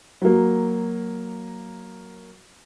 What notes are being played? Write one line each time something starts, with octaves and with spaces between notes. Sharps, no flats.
F#3 A#3